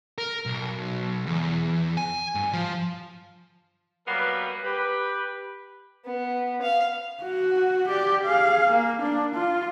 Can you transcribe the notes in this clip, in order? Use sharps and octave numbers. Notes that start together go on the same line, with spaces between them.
A#4
B1
E2
G#5
G2
F3
F#3 G3 A#3 B3 A#4 B4
G4 B4
B3
F5
F#4
G4 D5
G#4 F5
A#3
D4
F4